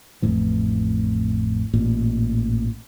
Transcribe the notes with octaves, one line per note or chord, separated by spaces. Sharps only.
A1 F2 A2 E3
A1 A#2